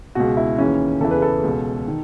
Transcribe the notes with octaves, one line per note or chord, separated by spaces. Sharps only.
C#2 B2 F#4
E4
D#2 C#3 E3 C#4
E2 C#3 E3 A4
B4
A4
C#2 B2
D#3